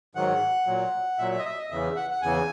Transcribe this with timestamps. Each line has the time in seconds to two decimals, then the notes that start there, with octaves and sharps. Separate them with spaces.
0.15 G#2 D#3 F#3 F#5
0.67 A#2 F#3
1.18 A#2 F#3 E5
1.31 E5
1.39 D#5
1.45 E5
1.57 D#5
1.70 E2 C#3 E3 E5
1.96 F#5
2.11 F#5
2.22 E2 C#3 E3 G#5